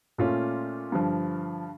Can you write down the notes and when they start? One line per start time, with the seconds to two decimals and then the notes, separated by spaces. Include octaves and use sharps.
0.18 A#2 A3 C#4 F4
0.92 G2 D3 F3